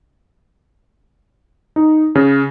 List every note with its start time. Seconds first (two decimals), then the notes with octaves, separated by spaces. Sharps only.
1.76 D#4
2.15 C#3